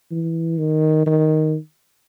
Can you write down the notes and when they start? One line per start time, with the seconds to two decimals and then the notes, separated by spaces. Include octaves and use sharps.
0.11 E3
0.58 D#3
1.06 D#3